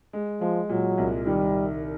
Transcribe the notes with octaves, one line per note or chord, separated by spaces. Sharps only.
G#3
F3 G#3
A#2 F#3
C2
D#3 G3